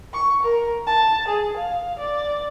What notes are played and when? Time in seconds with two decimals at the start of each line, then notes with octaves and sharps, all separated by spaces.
0.13 C#6
0.42 A#4
0.87 A5
1.28 G#4
1.57 F5
1.99 D5